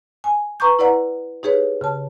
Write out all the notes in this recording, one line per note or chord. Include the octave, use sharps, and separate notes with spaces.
G#5
B4 A#5 C#6 D6 G6
E4 B4 D5 F#5 A#5
D#4 G4 G#4 B4 C#5
C#3 A5